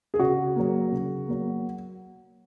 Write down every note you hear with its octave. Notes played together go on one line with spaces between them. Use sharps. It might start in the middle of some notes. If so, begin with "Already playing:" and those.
G#4
C#3 F#4
F#3 A#3
C#3
F#3 A#3